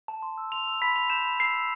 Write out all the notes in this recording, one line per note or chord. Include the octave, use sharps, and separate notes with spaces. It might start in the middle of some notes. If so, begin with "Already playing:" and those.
A5
C6
E6
C6 F7
E6
B5 B6
B5 F7
G6 E7
B5
E6 C7
E6